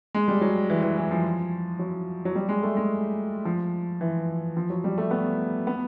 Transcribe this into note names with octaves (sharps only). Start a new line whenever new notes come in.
G#3
G3
F#3
E3
E3
E3
F3
F#3
F#3
G3
G#3
A3
G#3
F3
E3
F3
F#3
G3
A3
B3
B3